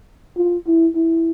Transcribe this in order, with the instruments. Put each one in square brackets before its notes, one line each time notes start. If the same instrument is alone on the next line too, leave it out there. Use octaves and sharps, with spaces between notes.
[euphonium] F4
E4
E4